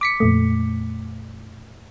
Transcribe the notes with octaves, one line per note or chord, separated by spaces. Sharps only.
D6 B6 C#7
F2 A#2 A3